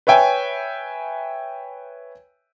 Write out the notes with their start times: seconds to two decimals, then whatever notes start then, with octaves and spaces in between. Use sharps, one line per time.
0.07 B4 C#5 E5 G5 G#5